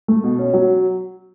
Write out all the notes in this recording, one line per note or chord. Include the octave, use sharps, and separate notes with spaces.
A3
B2
C#4
F#3